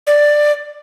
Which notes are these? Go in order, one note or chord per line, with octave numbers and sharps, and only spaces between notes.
D5